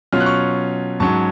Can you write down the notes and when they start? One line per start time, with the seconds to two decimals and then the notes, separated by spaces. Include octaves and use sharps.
0.12 B2 F#3 C#4 F4 F6
0.20 F#6
0.26 C#6 F6
1.00 G#2 F#3 C#4 A5 C#6